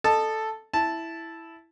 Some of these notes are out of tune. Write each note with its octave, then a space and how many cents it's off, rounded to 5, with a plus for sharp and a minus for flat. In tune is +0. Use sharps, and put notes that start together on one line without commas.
A4 +0 D#5 -20 A5 +0
E4 +0 A5 -5